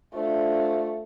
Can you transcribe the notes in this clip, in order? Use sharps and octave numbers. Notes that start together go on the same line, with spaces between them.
A3 D4 F4 C5